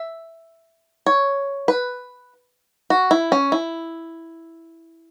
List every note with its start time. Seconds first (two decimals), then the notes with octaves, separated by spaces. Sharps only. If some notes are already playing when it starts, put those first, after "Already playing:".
Already playing: E5
1.06 C#5
1.68 B4
2.90 F#4
3.11 E4
3.32 C#4
3.52 E4